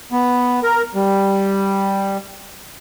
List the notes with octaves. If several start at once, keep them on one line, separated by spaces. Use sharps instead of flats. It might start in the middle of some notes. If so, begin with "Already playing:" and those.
B3
A#4
G3